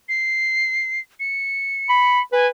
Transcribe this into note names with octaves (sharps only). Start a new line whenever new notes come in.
C7
C#7
B5
B4 G#5